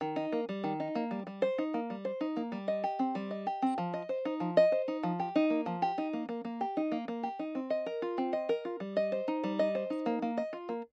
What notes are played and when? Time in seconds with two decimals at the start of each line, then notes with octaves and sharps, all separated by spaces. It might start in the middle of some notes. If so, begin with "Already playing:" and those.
0.01 D#3
0.16 D#4
0.32 A#3
0.49 G3
0.64 D#3
0.80 D#4
0.95 A#3
1.11 G3
1.27 G3
1.42 C5
1.58 D#4
1.74 A#3
1.90 G3
2.05 C5
2.21 D#4
2.37 A#3
2.52 G3
2.68 D#5
2.84 G4
2.99 C4
3.15 G3
3.31 D#5
3.47 G4
3.62 C4
3.78 F3
3.94 D#5
4.09 C5
4.25 D#4
4.40 F3
4.57 D#5
4.72 C5
4.88 D#4
5.03 F3
5.20 G4
5.36 D#4
5.50 A#3
5.66 F3
5.82 G4
5.98 D#4
6.13 A#3
6.29 A#3
6.45 A#3
6.61 G4
6.77 D#4
6.92 A#3
7.08 A#3
7.23 G4
7.39 D#4
7.55 C4
7.70 D#5
7.86 A#4
8.02 F4
8.18 C4
8.33 D#5
8.49 A#4
8.65 F4
8.80 G3
8.97 D#5
9.12 C5
9.28 D#4
9.44 G3
9.59 D#5
9.75 C5
9.90 D#4
10.06 A#3
10.22 A#3
10.37 D#5
10.53 F4
10.69 A#3